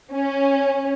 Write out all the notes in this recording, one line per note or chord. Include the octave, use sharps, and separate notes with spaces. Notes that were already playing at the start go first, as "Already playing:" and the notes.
C#4